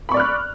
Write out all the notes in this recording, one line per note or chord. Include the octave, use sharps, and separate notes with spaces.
D5 B5 C#6 F6 F#6